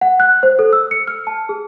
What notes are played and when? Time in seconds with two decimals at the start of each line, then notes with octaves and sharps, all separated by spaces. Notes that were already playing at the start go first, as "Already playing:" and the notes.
0.01 F#5
0.20 F#6
0.43 C5
0.59 A4
0.73 E6
0.91 C#7
1.08 F6
1.27 A5
1.49 G#4